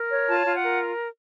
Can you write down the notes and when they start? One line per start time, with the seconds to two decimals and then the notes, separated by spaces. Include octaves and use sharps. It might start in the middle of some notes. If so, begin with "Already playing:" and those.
Already playing: A#4
0.11 C#5
0.28 F4 A5
0.45 F4 F5
0.55 F#5
0.64 A#4